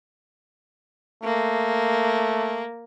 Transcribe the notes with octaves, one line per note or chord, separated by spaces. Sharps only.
A3 A#3